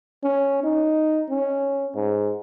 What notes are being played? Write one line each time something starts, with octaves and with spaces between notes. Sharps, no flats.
C#4
D#4
C#4
G#2